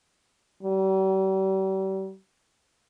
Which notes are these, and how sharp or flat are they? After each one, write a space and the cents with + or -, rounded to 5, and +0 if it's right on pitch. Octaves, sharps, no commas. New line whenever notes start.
G3 -40